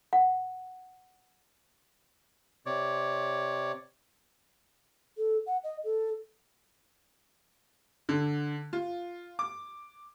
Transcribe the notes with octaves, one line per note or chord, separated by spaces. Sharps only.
F#5
C3 C#5 D5
A4
F#5
D#5
A4
D3
F4
D6